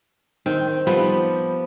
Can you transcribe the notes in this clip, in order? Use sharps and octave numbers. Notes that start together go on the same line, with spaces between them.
D#3 C4
F3 G3 B3